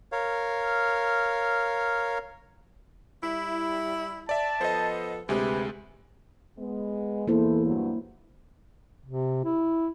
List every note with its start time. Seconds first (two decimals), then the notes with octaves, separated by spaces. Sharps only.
0.12 A#4 C#5 F5
3.23 G3 E4
4.29 D5 E5 A5
4.61 F3 B3 A4 C5 D#5
5.29 D2 C3 G#3 B4
6.58 G#3 B3
7.28 E2 A#3 E4 A4 C5
7.65 G2 F#3
9.06 C3
9.45 E4